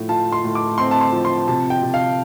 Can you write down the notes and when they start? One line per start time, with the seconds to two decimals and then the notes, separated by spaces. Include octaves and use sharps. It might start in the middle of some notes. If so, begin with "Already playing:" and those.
Already playing: A2 F3
0.09 F4 A5
0.32 C6
0.44 A2
0.55 D6
0.78 C4 C6
0.91 A5
1.01 C6
1.13 F3
1.25 C6
1.48 C3 A5
1.70 G5
1.82 C3
1.94 F5